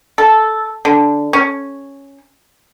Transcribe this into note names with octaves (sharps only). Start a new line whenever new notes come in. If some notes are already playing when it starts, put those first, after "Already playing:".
A4
D3
C#4